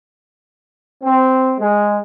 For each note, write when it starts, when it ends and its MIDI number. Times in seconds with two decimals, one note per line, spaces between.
1.03 1.54 60
1.59 1.99 56